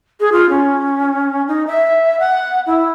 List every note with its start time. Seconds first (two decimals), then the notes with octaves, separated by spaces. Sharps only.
0.20 G#4
0.32 F4
0.49 C#4
1.48 D#4
1.67 E5
2.19 F#5
2.66 E4